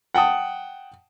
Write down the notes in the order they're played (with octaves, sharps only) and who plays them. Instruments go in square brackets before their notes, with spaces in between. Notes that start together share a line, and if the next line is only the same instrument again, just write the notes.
[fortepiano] F#5 G5 A5 D#6